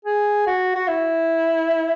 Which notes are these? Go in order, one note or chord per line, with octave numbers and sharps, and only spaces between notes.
G#4
F#4
F#4
E4